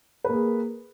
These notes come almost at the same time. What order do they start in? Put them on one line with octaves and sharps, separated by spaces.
B4 A#3 G#4